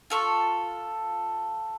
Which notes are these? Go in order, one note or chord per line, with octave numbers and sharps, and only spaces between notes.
F4 A4 C#6